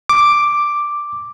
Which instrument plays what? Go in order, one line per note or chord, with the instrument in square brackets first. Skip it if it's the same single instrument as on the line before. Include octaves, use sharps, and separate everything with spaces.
[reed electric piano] D6